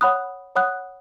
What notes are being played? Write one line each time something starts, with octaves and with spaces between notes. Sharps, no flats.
C#5 F#5 B5 D#6 F#6
C#5 F#5 B5 D#6 F#6